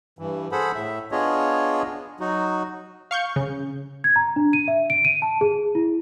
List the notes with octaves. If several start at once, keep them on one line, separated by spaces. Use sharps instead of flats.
G2 E3
G#4 A4 C5 F#5 B5
A2 E5
B3 D4 F4 G#4 C#5 D#5
F#3 D#4 F#4
F5 C#6 G6
C#3
G#6
A#5
D4
D#7
E5
D7
D#7
A5
G#4
E4